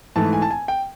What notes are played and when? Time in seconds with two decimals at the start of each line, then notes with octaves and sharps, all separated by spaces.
0.16 G#2 E3 A3 A5
0.33 G#5
0.42 A5
0.51 G#5
0.68 G5